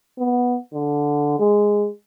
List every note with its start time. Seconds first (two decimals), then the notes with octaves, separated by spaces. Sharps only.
0.19 B3
0.73 D3
1.39 G#3